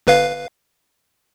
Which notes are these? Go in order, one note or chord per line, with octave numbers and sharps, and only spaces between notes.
G1 B4 F5